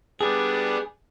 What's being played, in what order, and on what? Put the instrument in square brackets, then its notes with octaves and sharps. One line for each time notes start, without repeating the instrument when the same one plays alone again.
[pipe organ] G3 B3 D4 [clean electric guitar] G#4